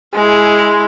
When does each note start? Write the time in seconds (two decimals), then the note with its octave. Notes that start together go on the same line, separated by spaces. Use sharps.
0.14 G#3 E4